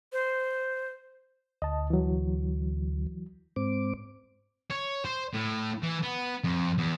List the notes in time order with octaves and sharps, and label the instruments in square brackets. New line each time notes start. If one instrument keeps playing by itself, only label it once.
[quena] C5
[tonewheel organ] D2 [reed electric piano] D#5 A5
[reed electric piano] E3 F#3
[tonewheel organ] G#2 C4 D6
[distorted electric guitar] C#5
C5
A2
E3
B3
F2
E2